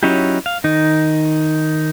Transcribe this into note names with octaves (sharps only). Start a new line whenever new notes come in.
F#3 C#4 D#4 E4 G4
F5
D#3 D#4